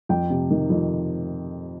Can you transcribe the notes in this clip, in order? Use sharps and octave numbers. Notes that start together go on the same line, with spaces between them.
F2 G5
C3
D#3
F2